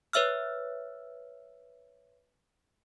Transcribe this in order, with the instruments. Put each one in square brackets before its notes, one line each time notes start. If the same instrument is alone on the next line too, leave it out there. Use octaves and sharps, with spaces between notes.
[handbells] B4 C#5 E5 E6 F6